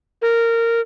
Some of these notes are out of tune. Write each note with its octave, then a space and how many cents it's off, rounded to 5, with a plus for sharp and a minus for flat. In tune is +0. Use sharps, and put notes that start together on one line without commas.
A#4 -15